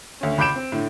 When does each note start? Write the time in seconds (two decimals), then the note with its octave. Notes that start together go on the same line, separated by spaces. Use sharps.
0.21 D2 C#4
0.38 C#2 B5 D6 G6 D7 E7
0.56 C4
0.72 A2 D3